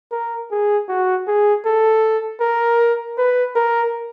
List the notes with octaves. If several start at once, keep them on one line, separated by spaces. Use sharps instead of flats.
A#4
G#4
F#4
G#4
A4
A#4
B4
A#4